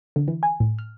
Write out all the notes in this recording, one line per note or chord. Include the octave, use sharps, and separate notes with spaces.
D3
E3
G#5
A2
F6